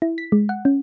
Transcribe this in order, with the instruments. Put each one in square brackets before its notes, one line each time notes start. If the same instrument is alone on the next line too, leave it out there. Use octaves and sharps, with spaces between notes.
[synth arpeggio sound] E4
B6
G#3
F#5
C#4